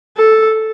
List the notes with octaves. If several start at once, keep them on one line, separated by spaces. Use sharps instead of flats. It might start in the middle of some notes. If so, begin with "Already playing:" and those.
A4